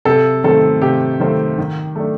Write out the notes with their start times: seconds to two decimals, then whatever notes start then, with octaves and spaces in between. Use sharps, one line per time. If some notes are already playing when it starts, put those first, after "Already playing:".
0.05 C3 A4
0.44 D#3 A3 C4 A4
0.82 C3 G4
1.20 D#3 A3 C4
1.58 D#3
1.96 A3 D4